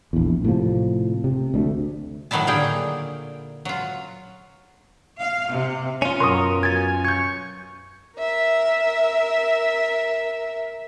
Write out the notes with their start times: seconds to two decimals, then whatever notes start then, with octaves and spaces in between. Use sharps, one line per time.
0.13 A#1 E2
0.44 A2 C3 F3
1.24 C3
1.54 D2 G3 A3
2.31 A2 D#3 F#3 D#4 E4 A5
2.47 A#2 D3 A#3 G#4 G5
3.65 F#3 F4
5.19 F5
5.51 C3
6.02 C#4 F4
6.20 F#2 B2 A#4 C6 C#6 D#6
6.63 G#5 G#6 A6
7.05 C#6 G6 G#6
8.18 A#4 E5